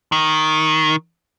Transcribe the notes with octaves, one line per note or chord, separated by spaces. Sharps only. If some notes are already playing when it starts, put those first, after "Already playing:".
D#3